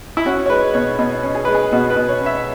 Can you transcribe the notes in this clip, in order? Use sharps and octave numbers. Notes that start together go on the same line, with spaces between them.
E4
C#4 F#4
C#5
G#3 B4
B2 C#5
B2
C#4
G#4
G#3 B4
G#4
B2 F#4
B4
B2
C#5
C#4
E5